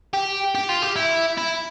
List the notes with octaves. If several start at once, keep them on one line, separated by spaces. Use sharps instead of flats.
G4
G4
F4
G4
E4
E4